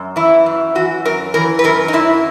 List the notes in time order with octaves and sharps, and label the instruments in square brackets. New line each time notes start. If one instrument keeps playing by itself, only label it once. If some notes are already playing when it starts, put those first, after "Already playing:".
Already playing: [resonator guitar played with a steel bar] F#2
E3 E4
F#2
E3 F#4
F#2 A#4
E3 A#4
B4
F#2 A#4
D#4
F#2 E4